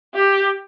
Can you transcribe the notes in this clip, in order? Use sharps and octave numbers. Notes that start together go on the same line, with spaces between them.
G4